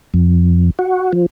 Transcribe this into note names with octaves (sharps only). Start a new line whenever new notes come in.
F2
F#4
F3